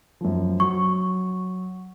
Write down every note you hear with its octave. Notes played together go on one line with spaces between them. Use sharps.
F#2 F3
F#3 C#6